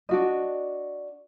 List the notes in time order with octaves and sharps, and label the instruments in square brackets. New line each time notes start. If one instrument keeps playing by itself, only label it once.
[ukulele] D4 F#4 D#5